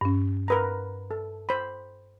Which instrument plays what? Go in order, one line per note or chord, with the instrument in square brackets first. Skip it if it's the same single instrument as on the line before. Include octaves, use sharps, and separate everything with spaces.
[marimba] G2 C#4
[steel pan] A#4 B4 A#5
A4
C5 B5